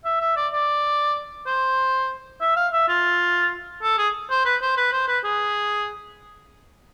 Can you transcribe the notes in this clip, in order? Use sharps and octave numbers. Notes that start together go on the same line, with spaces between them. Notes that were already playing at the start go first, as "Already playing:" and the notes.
E5
E5
D5
D5
C5
E5
F5
E5
F4
A4
G#4
C5
B4
C5
B4
C5
B4
G#4